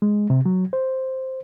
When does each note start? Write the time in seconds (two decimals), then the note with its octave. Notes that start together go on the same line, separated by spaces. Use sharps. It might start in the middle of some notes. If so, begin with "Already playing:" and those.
0.02 G#3
0.30 C3
0.46 F#3
0.73 C5